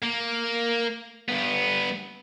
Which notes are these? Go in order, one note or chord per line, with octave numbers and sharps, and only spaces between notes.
A#3
G2 B3